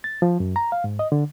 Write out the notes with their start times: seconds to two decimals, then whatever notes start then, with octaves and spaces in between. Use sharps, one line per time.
0.04 A6
0.22 F3
0.40 F#2
0.56 A#5
0.72 F5
0.84 G#2
0.99 D#5
1.12 D3